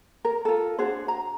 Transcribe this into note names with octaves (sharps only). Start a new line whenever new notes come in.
A#4
F4 A4
D4 F#4 G#4 C5
A#5